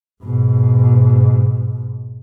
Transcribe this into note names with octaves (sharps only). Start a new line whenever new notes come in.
G#2 B2